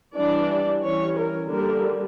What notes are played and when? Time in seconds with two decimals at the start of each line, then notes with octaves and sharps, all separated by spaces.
0.16 E3 G3 D4 D5
0.83 E3 G3 C#4 C#5
1.17 A#4
1.50 D3 G3 A#3 A#4